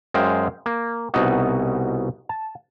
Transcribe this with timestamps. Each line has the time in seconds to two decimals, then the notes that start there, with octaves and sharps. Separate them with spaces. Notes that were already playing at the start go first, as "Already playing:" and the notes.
0.14 F#2 G#3 C5 F5 G5
0.66 A#3
1.14 C2 B2 D#4 F#4
2.29 A5